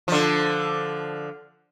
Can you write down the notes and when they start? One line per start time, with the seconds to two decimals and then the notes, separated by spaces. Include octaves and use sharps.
0.08 D3 F3